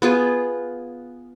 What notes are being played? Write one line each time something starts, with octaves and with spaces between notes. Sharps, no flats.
B3 F4 G#4